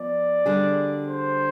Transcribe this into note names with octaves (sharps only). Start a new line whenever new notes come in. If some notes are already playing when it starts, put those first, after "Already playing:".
Already playing: F3 B3 D5
D3 G3 D4 G#4
C5